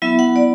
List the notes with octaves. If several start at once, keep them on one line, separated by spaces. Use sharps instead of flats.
F#3 B3 E4 E5
F#5
D5